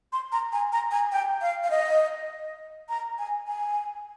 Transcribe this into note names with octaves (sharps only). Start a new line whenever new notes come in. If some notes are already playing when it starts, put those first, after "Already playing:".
C6
A#5
G#5
A#5
G#5
G5
F5
F5
D#5
A#5
G#5
G#5